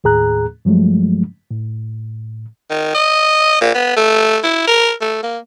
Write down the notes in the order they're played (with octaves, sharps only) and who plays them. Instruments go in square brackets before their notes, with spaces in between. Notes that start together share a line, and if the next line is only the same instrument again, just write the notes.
[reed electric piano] D#2 A2 G#4 A#5 F#6
G2 F3 F#3 G#3 A3
A2
[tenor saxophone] D#3
D#5
A#2
B3
A3
E4
A#4
A3
A#3